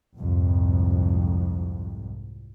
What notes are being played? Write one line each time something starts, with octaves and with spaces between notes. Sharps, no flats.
C2 F2 G#2